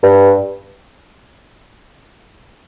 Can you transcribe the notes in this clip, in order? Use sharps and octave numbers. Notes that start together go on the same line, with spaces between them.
G2